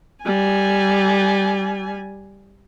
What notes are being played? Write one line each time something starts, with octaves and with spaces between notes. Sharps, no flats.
G3 G#5